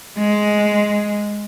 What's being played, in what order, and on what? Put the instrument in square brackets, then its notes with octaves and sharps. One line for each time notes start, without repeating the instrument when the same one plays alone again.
[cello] G#3